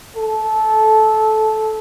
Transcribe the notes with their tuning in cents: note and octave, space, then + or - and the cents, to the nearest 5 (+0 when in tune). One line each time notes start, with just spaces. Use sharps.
A4 -15